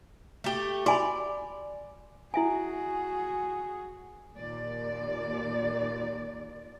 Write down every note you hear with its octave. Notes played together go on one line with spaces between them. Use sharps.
A3 G4
F#4 D5 G#5 B5
E4 F#4 G#4 E5 G#5
D#2 A#2 D5